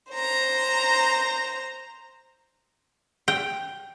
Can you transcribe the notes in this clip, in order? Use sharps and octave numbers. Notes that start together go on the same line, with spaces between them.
C5 A#5
G5